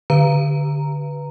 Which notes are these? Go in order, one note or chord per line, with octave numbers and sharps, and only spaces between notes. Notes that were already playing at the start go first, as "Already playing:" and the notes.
D3 B4 A#5